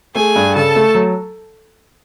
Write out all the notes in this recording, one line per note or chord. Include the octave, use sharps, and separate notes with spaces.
A3 G#4 G#5
G2
C#3 A4 A5
A3
F#3